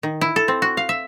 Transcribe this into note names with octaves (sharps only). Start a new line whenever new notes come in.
D#3
E4
A4
C4
F#4
F5
E5